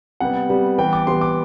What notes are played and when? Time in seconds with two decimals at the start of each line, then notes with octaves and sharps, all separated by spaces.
0.20 C3 G3 B3 F#5
0.49 C3 G3 B3
0.78 E3 G3 B3 G5
0.93 D6
1.07 E3 G3 B3 C6
1.21 D6